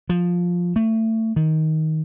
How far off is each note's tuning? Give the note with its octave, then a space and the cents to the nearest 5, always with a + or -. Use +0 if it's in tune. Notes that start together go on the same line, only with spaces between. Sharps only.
F3 +10
A3 +25
D#3 +15